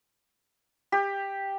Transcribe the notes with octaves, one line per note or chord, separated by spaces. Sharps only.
G4